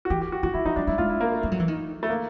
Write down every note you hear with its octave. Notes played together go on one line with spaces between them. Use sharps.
F#4
E3 G4
G4
F#4
D#3 F#4
E3 E4
F3 D#4
F#3 D4
G#3 E4
G#3 F4
E4
A#3
A3
G3
F#3
E3
D#3
A3
A#3